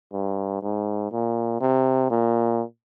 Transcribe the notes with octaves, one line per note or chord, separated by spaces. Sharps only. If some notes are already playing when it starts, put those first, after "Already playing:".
G2
G#2
A#2
C3
A#2